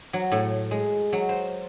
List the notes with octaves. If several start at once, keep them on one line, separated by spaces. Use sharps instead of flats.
F#3
A2
G#3
F#3
C5